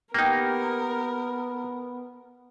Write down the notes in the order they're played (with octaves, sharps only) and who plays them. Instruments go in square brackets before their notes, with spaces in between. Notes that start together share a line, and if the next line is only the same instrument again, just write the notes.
[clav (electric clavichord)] A#3 D#4 [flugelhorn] B3 [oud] G4 [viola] A#4